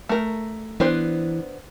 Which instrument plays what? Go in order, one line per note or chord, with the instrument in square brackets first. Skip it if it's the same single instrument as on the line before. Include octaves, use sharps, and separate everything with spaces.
[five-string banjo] A3 A#4
[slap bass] E3 [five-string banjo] B3 D4 C5